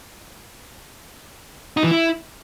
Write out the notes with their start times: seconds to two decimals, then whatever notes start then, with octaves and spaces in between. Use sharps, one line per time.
1.77 D#4
1.84 E3
1.91 E4